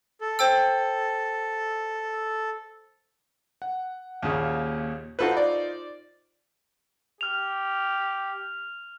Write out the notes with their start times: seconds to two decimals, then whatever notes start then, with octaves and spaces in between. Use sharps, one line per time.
0.21 A4
0.39 C5 G5 E6
3.62 F#5
4.22 D#2 A#2 C#3
5.19 D#4 F4 F#4 A4 B4 C5
5.37 D5
7.21 G4 F6 F7